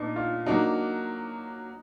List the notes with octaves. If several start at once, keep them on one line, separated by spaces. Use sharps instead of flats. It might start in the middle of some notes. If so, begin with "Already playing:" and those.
Already playing: A#2 B3 D4 D#4
F4
F#3 A#3 D4 D#4 F#4